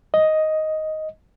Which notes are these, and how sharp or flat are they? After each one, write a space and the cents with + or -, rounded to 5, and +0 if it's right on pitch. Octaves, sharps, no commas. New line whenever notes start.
D#5 +5